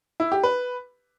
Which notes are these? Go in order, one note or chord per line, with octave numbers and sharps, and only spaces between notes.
E4
G4
B4